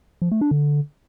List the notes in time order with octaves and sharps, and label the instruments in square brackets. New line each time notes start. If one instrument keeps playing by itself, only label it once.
[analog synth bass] F3
A3
D4
D3